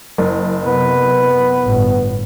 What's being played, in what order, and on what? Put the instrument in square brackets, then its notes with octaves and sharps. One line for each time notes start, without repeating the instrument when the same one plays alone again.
[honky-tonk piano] F#1
[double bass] C3 [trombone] B3 [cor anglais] B4
[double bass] G1 A2